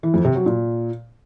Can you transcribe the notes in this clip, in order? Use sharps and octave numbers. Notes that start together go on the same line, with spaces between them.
E3
F2
C3
F#3
A#2